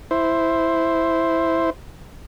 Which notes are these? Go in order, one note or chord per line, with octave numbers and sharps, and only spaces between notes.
E4 C5